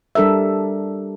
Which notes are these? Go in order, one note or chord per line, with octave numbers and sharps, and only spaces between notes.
G3 D4 A4 A#4 E5